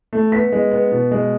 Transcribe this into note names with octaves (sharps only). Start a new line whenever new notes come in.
A3
B3 B6
G#3
B3
B2
G#3